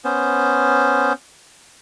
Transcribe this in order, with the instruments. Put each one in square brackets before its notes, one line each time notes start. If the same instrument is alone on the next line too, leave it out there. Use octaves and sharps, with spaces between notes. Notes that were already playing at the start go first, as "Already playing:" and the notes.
[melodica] B3 C#4 C5